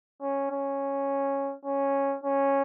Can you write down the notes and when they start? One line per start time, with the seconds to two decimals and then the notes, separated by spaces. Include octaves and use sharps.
0.21 C#4
0.51 C#4
1.65 C#4
2.24 C#4